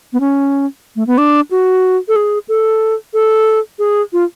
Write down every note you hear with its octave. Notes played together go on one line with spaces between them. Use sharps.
B3
C#4
A3
B3
D4
F#4
A4
G#4
A4
A4
G#4
F4